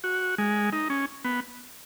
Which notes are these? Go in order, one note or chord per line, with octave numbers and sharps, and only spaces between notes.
F#4
G#3
D#4
C#4
B3